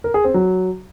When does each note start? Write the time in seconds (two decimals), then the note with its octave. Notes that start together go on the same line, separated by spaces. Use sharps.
0.04 A#4
0.14 G#4
0.24 C4
0.34 F#3